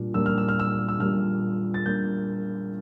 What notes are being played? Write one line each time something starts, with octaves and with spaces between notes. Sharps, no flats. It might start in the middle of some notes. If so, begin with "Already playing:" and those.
Already playing: A#2 G3 D4
A#2 G3 A#3 D4 E6
F6
E6
F6
E6
E6
A#2 G3 A#3 D4 F6
A6
A#2 G3 A#3 D4 G6